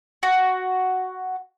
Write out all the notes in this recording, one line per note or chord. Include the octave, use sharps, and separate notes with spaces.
F#4